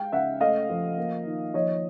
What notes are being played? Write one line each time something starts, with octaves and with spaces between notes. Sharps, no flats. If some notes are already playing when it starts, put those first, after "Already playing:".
Already playing: G#3 F5 G5
C#3 E5 F#5
A3 D#5 F5
F3
A#3
D#3
F3 C#5 D#5